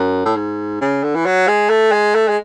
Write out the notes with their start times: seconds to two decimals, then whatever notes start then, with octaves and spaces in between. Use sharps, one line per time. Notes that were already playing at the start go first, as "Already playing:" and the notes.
Already playing: F#2
0.25 A2
0.36 G#2
0.81 C#3
1.04 D3
1.15 E3
1.26 F#3
1.48 G#3
1.70 A3
1.92 G#3
2.15 A3
2.28 G#3